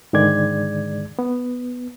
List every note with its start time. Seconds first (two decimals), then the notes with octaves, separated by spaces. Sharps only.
0.13 G#2 D3 D#3 G#3 D5 G#6
1.19 B3